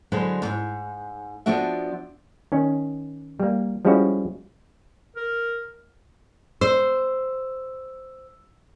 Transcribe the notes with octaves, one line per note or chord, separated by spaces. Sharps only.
D3 F#3 G#3 B4 C5
E2 G#2
F3 B3 D4 F#4 E5
D#3 C#4
G3 A#3
F3 G3 G#3 C#4 E4 F#4
A#4
C5 E6